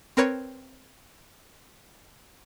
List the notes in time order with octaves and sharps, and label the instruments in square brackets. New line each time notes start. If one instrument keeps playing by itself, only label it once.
[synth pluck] C4 A#4 B4 C#5